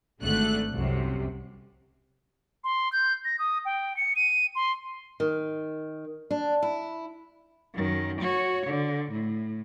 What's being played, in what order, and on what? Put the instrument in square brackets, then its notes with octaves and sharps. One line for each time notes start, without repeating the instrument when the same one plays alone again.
[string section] G#1 D3 A3 F#6
C2 F#2 C3
[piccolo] C6
G6
A#6
D#6
G5
C#7
D#7
C6
[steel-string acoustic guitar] D#3
D4
E4
[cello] F#2 D#3
F#4 C#5
D3
A2